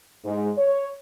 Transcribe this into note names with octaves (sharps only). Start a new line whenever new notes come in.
G#2
C#5